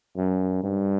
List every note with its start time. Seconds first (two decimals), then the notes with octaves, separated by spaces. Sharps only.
0.17 F#2
0.64 G2